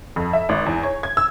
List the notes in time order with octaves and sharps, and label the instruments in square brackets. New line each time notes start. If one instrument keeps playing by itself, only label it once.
[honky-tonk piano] F2
E5
G#1
E2
C#5
G#6
E6